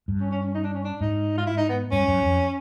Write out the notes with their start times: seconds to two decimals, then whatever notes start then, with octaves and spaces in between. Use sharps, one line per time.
0.08 G2
0.20 C#4
0.31 C#4
0.43 C#4
0.54 D#4
0.63 D4
0.74 C#4
0.84 D4
1.01 G#2 D#4
1.37 F4
1.46 E4
1.57 D#4
1.69 B3
1.91 G2 C#4
2.08 F#2
2.23 F2